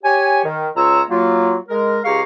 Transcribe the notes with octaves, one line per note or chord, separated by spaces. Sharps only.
G4 C#5 G#5
D#3
C#2 F4 C#5 A#5 E6
F#3 A#3 F4
G#3 A#4
C#2 G4 G#4 F5 A#5 C#6